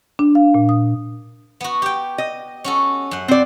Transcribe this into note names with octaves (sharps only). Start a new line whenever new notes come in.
D4
F5
A#2
D#6
B3 F#4
G4 G5
D#5
C#4 F#4 A4
F#2 F#5
C4 D5